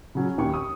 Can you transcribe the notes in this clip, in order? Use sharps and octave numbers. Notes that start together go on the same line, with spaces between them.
C#3 F#3 C#4
D#2 C#6
D#6